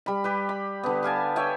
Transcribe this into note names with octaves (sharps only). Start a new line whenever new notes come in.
G3 B5
G4 B4
B5
D3 B3
G4 F5 G#5 A5
C#5 E5 G5 G#5